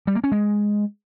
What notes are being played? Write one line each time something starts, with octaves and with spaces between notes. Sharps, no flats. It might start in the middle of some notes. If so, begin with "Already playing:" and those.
G3
A#3
C#4
G#3